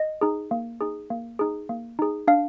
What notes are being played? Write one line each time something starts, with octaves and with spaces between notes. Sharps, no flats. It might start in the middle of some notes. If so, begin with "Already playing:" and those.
Already playing: D#5
D#4 G#4
A#3
D#4 G#4
A#3
D#4 G#4
A#3
D#4 G#4
D4 F5